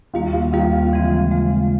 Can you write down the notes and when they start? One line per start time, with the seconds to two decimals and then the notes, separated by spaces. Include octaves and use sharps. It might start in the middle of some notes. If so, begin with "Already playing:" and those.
0.14 D#2 D#3 G3 A#3 F4
0.33 F4
0.52 D#2 D#3 G3 A#3 F4
0.92 C#3 E3 G#3 C4
1.30 C#3 E3 G#3 C4